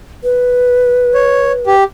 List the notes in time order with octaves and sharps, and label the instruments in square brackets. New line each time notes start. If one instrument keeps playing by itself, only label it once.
[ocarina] B4
[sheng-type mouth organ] C#5
G4